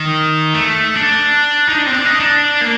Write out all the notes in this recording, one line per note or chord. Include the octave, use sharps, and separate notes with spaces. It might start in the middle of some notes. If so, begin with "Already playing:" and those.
Already playing: D#3
A3
D4
D#4
D4
C4
D4
D#4
D4
A#3